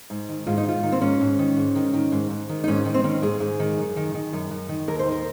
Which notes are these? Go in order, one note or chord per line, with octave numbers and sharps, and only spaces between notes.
G#2
D#3
G#2 F4
D#4
D#3 F4
D#3
C4
G#2 C#4
G#2
D#3
G#2
D#3
D#3
G#2
G#2
D#3
D#4
G#2 C#4
D#3
C4
D#3 C#4
G#2 G#4
G#2
D#3
F#2
D#3
D#3
F#2
F#2
D#3
D#2 A#4
C5
D#3
A#4